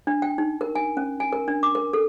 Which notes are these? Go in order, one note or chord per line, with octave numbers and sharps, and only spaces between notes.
D4
G5
D#4
A#4
G#5
C#4
G#5
A#4
D4
D6
A#4
A4